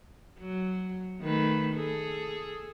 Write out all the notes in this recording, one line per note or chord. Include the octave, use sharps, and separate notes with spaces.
F#3
D#3 A3 B4
G#4 A4